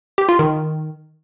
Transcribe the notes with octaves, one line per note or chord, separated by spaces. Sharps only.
G4
F4
D#3